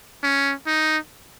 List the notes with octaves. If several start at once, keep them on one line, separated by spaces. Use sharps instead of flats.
C#4
D#4